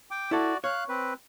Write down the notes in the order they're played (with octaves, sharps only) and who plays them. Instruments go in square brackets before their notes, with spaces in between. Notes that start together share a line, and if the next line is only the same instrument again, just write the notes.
[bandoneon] G5 D6
[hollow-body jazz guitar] E4 A4 [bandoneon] F#4 D5
[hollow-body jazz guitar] C#5 [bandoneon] F5 F#6
[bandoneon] C4 B4